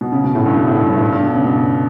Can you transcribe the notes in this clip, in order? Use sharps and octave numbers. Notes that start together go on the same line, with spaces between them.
B2
C#3
B2
A2
G2
B2
A2
G2
G2
A2
G2
G2
B2
C#3
B2